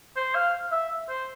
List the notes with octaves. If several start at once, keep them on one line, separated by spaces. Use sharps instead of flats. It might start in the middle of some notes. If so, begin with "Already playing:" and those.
C5
F5
E5
C5